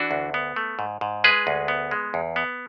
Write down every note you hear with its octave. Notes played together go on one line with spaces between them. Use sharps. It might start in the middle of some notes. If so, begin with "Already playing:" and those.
Already playing: E3 D4 F#4
D2
B3
A3
G#2
G#2
G#3 G#4 B4
D2
B3
G#3
E2
B3